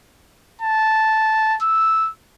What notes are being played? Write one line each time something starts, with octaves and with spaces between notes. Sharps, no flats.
A5
E6